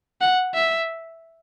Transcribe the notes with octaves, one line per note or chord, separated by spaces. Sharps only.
F#5
E5